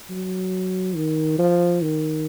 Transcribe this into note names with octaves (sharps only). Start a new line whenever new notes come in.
F#3
D#3
F3
D#3